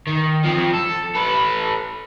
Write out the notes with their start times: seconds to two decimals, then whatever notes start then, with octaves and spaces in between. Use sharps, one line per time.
0.07 D#3
0.45 F3 C4
0.74 A4
1.15 A4 B4